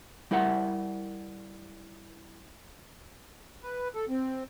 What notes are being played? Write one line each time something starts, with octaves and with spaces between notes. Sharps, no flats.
G3 E4 A#4 E5 F#5
B4
A4
C4